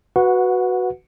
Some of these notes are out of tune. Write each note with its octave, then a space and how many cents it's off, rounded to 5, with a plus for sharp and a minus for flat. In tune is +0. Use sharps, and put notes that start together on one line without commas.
F#4 +0 B4 +0 F#5 -20